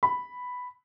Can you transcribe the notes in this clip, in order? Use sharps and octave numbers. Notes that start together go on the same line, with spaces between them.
B5